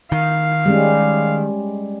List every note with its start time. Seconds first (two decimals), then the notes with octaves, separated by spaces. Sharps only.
0.12 D#3 F5
0.66 G3 G#3 C#4